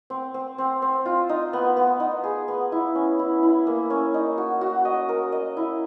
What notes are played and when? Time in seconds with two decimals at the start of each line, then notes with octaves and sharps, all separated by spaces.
0.10 C4
0.34 C4
0.58 C4
0.82 C4
1.06 F4
1.29 D#4
1.53 B3
1.77 B3
2.00 D#4
2.24 G#4
2.48 B3
2.72 E4
2.95 C#4
3.19 E4
3.43 E4
3.67 A#3
3.90 C#4
4.14 D#4
4.38 F#4
4.61 F#4
4.85 D#5
5.09 A#4
5.32 D#5
5.57 E4